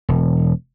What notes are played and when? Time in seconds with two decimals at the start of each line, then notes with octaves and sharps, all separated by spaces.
0.09 E1